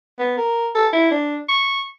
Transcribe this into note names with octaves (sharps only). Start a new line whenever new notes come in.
B3
A#4
A4
E4
D4
C#6